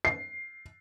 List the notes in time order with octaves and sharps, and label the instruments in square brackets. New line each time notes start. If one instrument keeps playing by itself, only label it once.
[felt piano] C7